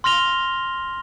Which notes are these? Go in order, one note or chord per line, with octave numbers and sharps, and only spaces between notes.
C6 F6 A#6 F7 G7